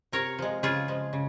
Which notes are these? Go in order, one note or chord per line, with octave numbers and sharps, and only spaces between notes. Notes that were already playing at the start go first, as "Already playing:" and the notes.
C3 A#4 C#5
F3 G#3
C#3 F4 G#4
F3 G#3
C#3